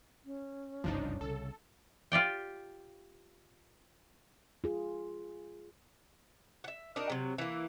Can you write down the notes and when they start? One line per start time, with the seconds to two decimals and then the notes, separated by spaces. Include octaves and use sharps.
0.25 C#4
0.84 F#1 C2 G2 F3 D4 D#4
1.21 C2 C#3 A4
2.12 F4 G4 D5 G5
4.64 F4 G#4
6.64 E5 F#5
6.96 D4 D#4 F#4 A#4
7.10 C3 F#3
7.38 E3 A#3